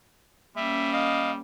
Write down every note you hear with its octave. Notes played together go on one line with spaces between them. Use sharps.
G3 A#3 C#4 E5
D#5 F5